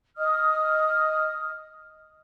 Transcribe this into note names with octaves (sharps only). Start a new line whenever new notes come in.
D#5 D#6 F6